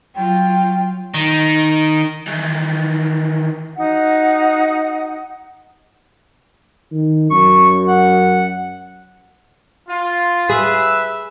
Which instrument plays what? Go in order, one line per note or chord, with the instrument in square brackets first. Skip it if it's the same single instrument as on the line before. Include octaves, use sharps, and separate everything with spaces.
[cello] F#3 F4 [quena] G5
[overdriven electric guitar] D#3
D#3 E3
[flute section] D#4 F#4 F#5
[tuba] D#3
[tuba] F#2 [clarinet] C#6
[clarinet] F#5
[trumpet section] F4
[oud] G#4 [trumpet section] B4 E5